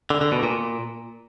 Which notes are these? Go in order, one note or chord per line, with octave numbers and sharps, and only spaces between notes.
D3
D3
B2
A#2